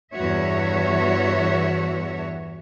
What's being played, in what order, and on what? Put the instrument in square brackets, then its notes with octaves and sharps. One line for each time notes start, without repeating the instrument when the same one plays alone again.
[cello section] E2 G2 F#4 C#5 E5